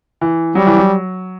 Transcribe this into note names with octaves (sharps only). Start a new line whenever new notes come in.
E3
F#3 G3
E3
F#3